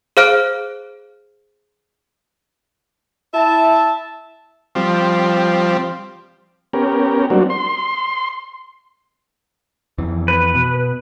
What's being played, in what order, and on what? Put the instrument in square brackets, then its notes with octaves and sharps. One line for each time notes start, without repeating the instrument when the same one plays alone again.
[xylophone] G#4 C5 F5 F6 F#6 D7
[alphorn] E4 [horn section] E5 A5
[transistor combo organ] F3 G3 C4
B3 C#4 G4 A#4
F#3 G3 A#3 C4 D4 F#4
C6
[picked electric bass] F2 E3
[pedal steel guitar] B4
[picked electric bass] B2